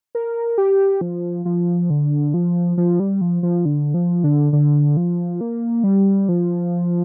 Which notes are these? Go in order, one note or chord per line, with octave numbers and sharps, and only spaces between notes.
A#4
G4
F3
F3
D3
F3
F3
G3
F3
F3
D3
F3
D3
D3
F3
A#3
G3
F3